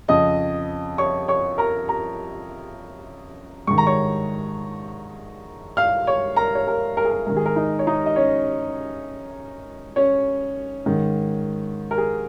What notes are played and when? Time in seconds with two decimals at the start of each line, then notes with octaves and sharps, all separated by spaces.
0.08 F2 C#3 D#5 D#6
0.98 C#5 C#6
1.28 C#5 C#6
1.58 A#4 A#5
1.89 A#4 A#5
3.67 G#2 D#3 C#6
3.78 A#5
3.87 C#5 C#6
5.77 F5 F6
6.07 C#5 C#6
6.36 A#4 A#5
6.55 C#5
6.67 A#4
6.97 A#4
7.04 G#4
7.10 A#4
7.26 G#2 D#3 A#4
7.37 G#4
7.46 A#4
7.56 D#4 D#5
7.79 C#5
7.87 D#4 D#5
8.06 D#5
8.16 C#4 C#5
9.96 C#4 C#5
10.86 G#2 D#3
11.91 A#4
11.98 G#4